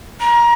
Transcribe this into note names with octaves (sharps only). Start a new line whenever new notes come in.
A#5